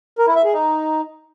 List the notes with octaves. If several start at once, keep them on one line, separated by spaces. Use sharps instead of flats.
A#4
E4
E5
G#4
D#4